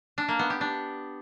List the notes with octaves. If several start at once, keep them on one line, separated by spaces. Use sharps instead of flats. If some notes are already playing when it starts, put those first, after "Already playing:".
D4
A#3
B3
G4
D4